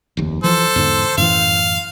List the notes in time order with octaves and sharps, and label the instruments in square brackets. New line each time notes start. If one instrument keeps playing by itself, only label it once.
[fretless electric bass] F1 D#2
[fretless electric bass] E3 F3 [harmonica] A4 C5
[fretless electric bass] E2 G#2 D3
[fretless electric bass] F#2 A2 E3 [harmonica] F5